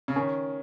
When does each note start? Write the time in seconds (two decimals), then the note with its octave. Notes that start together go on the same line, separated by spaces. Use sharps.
0.08 C#3
0.16 D#3 C#4